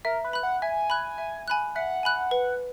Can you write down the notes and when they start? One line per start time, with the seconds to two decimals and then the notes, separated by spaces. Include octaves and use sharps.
0.05 A#4 E5
0.24 B4
0.33 B5 F#6
0.43 F#5
0.62 E5 G#5
0.90 B5 F#6
1.18 E5
1.48 G#5 B5 F#6
1.75 E5 F#5
2.03 G#5 B5 F#6
2.31 B4